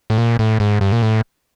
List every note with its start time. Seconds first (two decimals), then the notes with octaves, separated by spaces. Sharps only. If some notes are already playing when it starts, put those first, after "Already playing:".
0.10 A2
0.18 A#2
0.39 A2
0.60 G#2
0.81 G2
0.92 A#2
1.02 A2